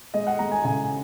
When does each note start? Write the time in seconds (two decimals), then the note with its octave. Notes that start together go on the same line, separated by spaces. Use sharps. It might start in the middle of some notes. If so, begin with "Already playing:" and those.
0.14 G#3 D#5
0.27 F#5
0.39 G#3 A#5
0.52 G#5
0.64 C#3 G#5